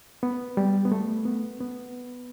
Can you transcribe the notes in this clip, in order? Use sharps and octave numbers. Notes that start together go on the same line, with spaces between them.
B3
G3
B3
A3
B3
B3